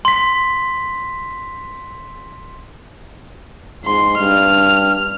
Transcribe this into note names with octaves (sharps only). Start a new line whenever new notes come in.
C6 B6
G#2 C6
G2 F6